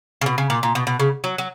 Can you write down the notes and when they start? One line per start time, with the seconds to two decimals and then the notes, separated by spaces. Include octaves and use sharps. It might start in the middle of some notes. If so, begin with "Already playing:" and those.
0.21 C#3
0.26 B2
0.38 C#3
0.50 A#2
0.63 A#2
0.75 B2
0.87 B2
1.00 C#3
1.24 F#3
1.38 F#3